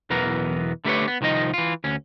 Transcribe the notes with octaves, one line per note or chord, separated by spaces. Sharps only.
B1 E2 E3 B3 A#4
D3 A3 G4 A#4 B4 C#5
B3
C2 D#3 F3 D#4 D#5
E3 F4
D2 C#4